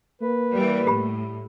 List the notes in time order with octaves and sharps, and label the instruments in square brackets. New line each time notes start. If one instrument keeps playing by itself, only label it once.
[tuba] A#3 [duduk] B4
[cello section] E3 G3
[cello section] A2 [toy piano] G4 B5